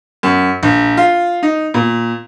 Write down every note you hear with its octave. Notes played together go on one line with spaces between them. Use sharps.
F#2
A#1
F4
D#4
A#2